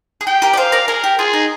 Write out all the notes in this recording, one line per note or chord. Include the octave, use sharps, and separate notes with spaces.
G#4
G4 G5
G4 A#4
D5
G#4 C5 F5
A#4 D5
G#4 A#4
G4
F4 G#4
D#4